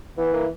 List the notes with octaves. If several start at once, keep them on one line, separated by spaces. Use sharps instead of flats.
E3 B3
A#3